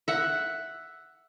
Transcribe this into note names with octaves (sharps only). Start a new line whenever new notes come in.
E5 F#5